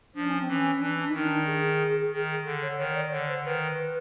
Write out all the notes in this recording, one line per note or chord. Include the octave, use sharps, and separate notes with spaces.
F3 D4
C#4
C4
E3 C#4
E3 D4
D4
D#4
D#3
D4
G#4
D#3
D3 A4
C#5
D#3 C#5
D5
D3 C#5
C5
D#3 B4